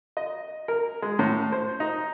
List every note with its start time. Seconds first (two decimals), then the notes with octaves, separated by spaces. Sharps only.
0.17 D#5
0.68 A#4
1.02 G#3
1.19 A2
1.52 C5
1.80 D#4